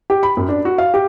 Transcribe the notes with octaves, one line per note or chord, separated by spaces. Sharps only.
G4
B5
F#2
D4
F#4
F5
G4